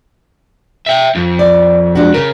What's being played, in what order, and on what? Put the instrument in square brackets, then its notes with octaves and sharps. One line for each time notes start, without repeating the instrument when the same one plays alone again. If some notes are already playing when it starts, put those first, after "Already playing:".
[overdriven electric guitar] E5 G5
F2
[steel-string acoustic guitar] D5
G#3 D4 F#4
[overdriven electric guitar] C#3 [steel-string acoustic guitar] A#4